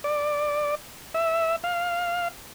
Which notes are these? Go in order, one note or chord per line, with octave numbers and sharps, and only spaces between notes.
D5
E5
F5